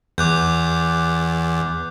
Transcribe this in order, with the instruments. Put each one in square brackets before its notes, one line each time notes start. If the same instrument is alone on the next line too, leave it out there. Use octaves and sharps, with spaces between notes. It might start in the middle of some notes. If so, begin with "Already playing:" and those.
[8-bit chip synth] E2 [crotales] D6 F#6 G6